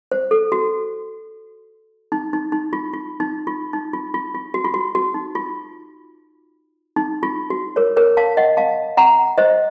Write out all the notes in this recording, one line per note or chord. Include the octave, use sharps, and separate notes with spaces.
C5
A4
F#4
D#4
D#4
D#4
F4
F4
D#4
F4
D#4
F4
F4
F4
F#4
F4
F#4
F#4
D#4
F4
D#4
F4
F#4
A#4 C#5
A#4 C#5
F5 A5
D#5 F#5
F5 A5
F#5 A#5
C5 D#5